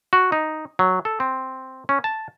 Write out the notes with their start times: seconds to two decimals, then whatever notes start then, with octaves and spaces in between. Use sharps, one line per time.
0.13 F#4
0.32 D#4
0.79 F#3
1.05 A4
1.20 C4
1.89 C#4
2.04 A5